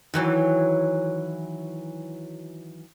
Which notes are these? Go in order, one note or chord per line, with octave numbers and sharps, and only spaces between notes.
D#3 E3 F#3